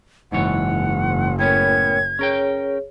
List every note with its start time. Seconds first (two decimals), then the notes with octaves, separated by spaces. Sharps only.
0.32 F#1 G#2 E3 C#5 F#5
1.39 A2 B3 C#4 A#4 C#5 G5 G#6
2.19 C#4 G#4 A#4 C#5 G5